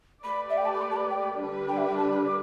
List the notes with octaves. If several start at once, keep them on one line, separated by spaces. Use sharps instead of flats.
A3 G4 B4 D5 B5
E5
G5
A5
B5
D6
A5
B5
G5
D3 G3 D4 B4
G5
E5
G5
A5
B5
D6